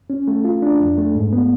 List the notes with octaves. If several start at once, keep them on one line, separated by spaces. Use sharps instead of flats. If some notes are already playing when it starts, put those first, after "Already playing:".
C#4
A3
F4
D4
F2
A3
G#2
B3